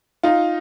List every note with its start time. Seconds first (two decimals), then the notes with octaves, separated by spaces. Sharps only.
0.23 D#4 F4